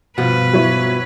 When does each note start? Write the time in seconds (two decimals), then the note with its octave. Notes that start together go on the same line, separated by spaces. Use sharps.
0.18 G2 B2 F3 F4 F#4 B4
0.53 F#3 E4 C#5